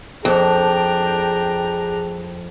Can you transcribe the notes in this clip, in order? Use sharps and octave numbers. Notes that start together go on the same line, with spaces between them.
F2 D4 G#4 G5 A#5